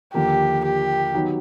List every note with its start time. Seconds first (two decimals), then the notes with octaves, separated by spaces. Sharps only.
0.14 D#2 D3 F3 A#3 G4
0.65 G4
1.13 D#3 F#3 B3 D#4 F#4